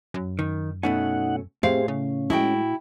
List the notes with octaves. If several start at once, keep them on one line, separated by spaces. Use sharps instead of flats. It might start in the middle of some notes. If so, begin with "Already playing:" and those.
F#2
D#3
B2 A3 C#4 D#4 F#5
A2 C4 G4 G#4 C5 F5
C#3 C#4
G#3 E4 F#4 G5